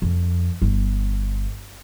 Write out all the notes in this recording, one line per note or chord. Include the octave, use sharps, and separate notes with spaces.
F2
G1